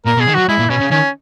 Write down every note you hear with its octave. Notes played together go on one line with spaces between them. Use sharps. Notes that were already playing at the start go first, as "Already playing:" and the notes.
A#2 A#4
B2
G#4
D#3
F#3 F#4
G#3 E4
A#2
B2 C#4
C#3
D#3 C#4